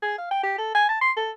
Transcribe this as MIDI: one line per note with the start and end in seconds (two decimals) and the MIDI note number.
0.02 0.17 68
0.18 0.30 77
0.31 0.42 79
0.43 0.54 67
0.58 0.71 69
0.75 0.87 80
0.89 1.01 81
1.01 1.11 84
1.17 1.31 69